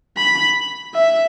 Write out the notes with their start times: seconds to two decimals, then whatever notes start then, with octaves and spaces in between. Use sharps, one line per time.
0.17 B5
0.94 E5